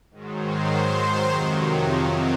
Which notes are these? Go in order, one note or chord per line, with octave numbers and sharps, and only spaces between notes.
G#2 D#3 F#3
C5
C5
F2 C3 D#3 F#3